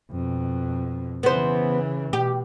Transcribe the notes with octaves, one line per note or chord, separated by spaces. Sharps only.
F2 B2
C#3 E3 B3 C5
B2 G4